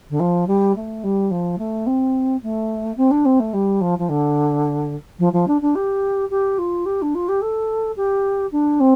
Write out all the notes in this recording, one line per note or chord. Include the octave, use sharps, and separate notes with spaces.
D3
F3
G3
A3
G3
F3
A3
C4
A3
C4
D4
C4
A3
G3
F3
F3
D3
F3
F3
D4
D4
G4
G4
F4
G4
D4
F4
G4
A4
G4
D4
C4